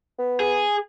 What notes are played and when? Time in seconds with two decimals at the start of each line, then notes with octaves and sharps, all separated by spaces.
0.19 B3
0.40 G#4